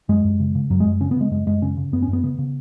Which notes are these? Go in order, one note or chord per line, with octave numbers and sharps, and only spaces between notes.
F#2 G#3
F#2
C#3
C#3
F#2 F#3
G#3
F#2
C#3 C#4
B3
C#3 G#3
F#2 G#3
F#2 G#3
C#3 C#4
C#3
F#2 B3
C#4
F#2
B3
C#3 B3
C#3